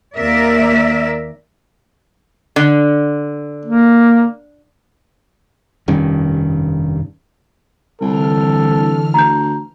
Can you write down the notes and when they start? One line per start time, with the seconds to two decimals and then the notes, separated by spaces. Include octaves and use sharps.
0.17 D#2 A#3 A#4 D5 E5
2.56 D3
3.66 A#3
5.88 F1 G2 D#3 C#4
8.01 C2 D3 E3 A4 F6
9.14 D2 A#5 G6